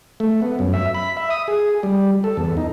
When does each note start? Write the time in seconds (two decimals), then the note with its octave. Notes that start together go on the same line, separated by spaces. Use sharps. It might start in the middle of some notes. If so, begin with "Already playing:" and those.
0.20 A3
0.42 B3
0.59 F#2
0.74 E5
0.94 B5
1.17 E5
1.30 D#6
1.48 G#4
1.83 G3
2.24 A4
2.37 E2
2.57 D#4